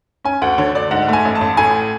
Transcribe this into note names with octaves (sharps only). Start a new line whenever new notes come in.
C#4 G#5
D2 F#5
D3 C#5
D2 D5
G#2 F#5
A3 G#5
A1
A5
A1
A2 G#5